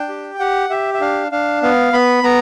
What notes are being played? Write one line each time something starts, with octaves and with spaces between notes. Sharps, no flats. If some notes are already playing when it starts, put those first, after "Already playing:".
Already playing: D4 G5
G4
G4 F#5
G4 E5
E5
D4 F5
D4 F5
B3 F5
B3 B5
B3 A#5